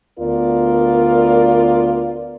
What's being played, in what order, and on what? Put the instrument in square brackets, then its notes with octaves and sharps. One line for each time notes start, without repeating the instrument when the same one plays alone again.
[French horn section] D2 B3 F4 A#4 D5